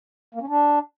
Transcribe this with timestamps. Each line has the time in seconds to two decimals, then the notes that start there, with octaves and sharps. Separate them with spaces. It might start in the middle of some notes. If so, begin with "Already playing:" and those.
0.35 A#3
0.41 C#4
0.48 D4